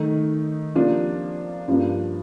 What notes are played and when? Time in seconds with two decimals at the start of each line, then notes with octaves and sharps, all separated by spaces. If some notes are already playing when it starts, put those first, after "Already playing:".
Already playing: D#3 A3 D#4
0.75 C3 F3 A#3 D4 F4
1.68 G2 F3 A#3 D4